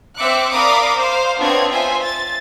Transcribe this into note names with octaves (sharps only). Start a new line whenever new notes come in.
C4 C5 E5 D6 F#6 C#7
A#4 D5 F5 B5 D6 D#6
C5 F5
B3 C4 D4 F4 C#5 G#6
F4 C5 E5 G#5
A6